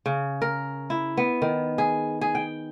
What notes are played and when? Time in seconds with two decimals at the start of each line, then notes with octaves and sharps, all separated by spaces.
0.06 C#3
0.42 A#4
0.90 E4
1.17 B3
1.42 D#3
1.78 G#4
2.21 G#4
2.35 G5